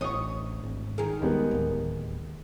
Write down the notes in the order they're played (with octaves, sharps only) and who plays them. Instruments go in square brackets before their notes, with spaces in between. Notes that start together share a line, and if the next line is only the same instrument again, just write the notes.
[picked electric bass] A1 [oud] D2 C#5 D#5 [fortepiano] C#6 D#6
[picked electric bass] G#1
[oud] D#3 A#4 [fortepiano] G#4
[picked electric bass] D#2 [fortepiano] G3 G#3 B3
[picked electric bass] D1 D#2